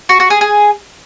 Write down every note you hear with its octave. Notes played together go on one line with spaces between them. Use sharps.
F#4
F#4
G#4
G#4